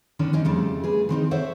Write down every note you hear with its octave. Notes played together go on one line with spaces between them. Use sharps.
D3 D#3 B3 C#4 D4
C4 C#4 D#4
F2 C#3 G3 A3
G#4 B4
D#3 C4 D4 D#4
A4 C5 C#5 E5 F#5